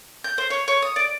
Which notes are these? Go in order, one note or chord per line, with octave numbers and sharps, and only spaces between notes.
G6
C5
C#5
C#5
D#6
D5